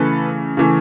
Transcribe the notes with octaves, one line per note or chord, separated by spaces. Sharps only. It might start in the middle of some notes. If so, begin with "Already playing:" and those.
Already playing: C#3 E3 A3 A4 B4
C#3 E3 A3